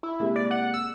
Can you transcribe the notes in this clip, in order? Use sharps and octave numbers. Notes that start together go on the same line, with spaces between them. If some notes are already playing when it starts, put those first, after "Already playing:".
E4
C3 G#3 A#3
D5
F#5
E6